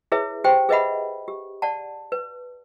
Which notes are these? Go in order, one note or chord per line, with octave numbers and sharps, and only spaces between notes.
E4 G#4 B4 C#5 E5
G4 C5 G5
G#4 B4 D#5 E5 F#5 B5
G4
D5 F#5 A5
B4